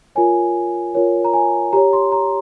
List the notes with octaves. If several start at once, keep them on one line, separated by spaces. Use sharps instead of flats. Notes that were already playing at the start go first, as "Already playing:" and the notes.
F4 A#4 C#5 G#5
F4 A#4 C#5
A#5
G#5
G4 C#5 A#5
C6
A#5